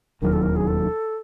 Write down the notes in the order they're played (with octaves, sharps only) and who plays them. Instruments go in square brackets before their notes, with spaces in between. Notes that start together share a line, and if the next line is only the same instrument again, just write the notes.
[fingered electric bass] E1 D#2 D#3 F#3 [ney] A#4
[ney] A4
A#4
G#4
A4